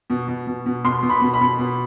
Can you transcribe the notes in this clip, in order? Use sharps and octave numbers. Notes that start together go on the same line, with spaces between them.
B2
B2
B2
B2
B2 C6
B2
B5
B2
B5
B2
B2